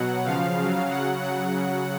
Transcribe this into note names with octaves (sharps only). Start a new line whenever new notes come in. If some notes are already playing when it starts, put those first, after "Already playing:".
Already playing: B2 F#3 F#5
C#3 F3 F5
C#3 F#3
C#3 F#3 F#5
C#3 F#3 F#5
C#3 F#3